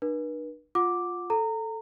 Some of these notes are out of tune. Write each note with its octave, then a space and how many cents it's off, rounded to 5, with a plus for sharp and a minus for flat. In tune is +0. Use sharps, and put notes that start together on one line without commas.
D4 +45 B4 -40
F4 +10 F#5 -10 D6 +0
A4 +0 A#5 -25